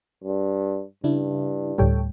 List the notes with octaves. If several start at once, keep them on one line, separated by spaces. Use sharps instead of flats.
G2
G2 C#3 D4 E4
D2 A2 G3 A4 C#5 G5